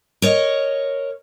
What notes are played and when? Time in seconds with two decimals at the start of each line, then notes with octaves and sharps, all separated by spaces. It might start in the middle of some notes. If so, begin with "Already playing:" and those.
0.22 A#4 C#5 D#5